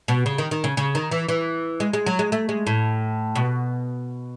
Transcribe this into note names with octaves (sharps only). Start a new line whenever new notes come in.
B2
C#3
D#3
D#3
C#3
C#3
D#3
E3
E3
G#3
G#3
F#3
G#3
A3
G#3
A2
B2